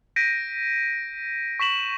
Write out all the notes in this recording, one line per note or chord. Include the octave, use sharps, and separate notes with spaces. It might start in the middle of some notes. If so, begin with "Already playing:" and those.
G6 A#6 B6 D7 D#7
C#6 B6 E7 F#7